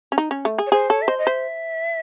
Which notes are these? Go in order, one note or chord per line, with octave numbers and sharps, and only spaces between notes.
C#4
D#4
C#4
A3
G#4
C#5
G#4 C5
A4 C#5
E5
C5 D#5
D#5
C5 E5